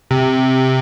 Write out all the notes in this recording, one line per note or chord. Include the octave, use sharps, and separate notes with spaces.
C3